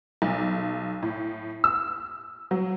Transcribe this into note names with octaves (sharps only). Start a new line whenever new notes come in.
B1
A2
E6
F#3